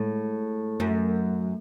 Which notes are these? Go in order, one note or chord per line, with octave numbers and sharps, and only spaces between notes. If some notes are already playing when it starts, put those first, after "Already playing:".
Already playing: A2 G#3
F#2 A3